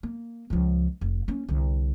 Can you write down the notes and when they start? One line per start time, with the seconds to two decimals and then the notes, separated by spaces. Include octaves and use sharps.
0.03 A#3
0.50 C#2 F3
1.01 F1
1.28 A#3 C#4
1.48 C2 D3